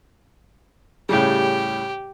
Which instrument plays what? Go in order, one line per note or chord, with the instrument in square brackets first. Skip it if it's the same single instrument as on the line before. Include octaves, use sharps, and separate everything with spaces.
[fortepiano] A2 C#3 G3 [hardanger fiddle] G4